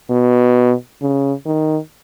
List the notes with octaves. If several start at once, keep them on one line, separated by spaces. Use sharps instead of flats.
B2
C#3
D#3